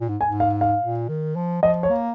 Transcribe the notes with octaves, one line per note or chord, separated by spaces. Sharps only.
A#2
G#2
G#5
G#2
F5
F5
A#2
D#3
F3
F3 D#5
C#5
A#3